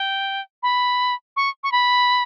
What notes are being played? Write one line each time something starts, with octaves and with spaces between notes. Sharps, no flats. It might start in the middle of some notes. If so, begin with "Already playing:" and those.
Already playing: G5
B5
C#6
C#6
B5